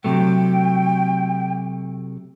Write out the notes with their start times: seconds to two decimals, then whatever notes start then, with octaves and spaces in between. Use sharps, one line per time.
0.04 C3 F#3 A3 G5